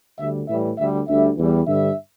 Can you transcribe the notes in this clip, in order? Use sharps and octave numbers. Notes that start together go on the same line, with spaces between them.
D2 D3 G3 E5
A2 E3 G3 E5
D2 D3 G3 E5
D2 D3 G3 E5
E2 E3 G3
G2 D3 G3 E5